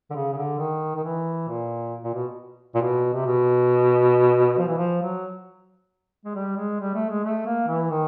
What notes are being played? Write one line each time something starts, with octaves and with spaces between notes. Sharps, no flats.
D3
C#3
C#3
D3
D#3
D#3
E3
A#2
A#2
B2
A#2
B2
C3
B2
F3
E3
F3
F#3
G#3
G3
G#3
G3
A3
G#3
A3
A#3
E3
D#3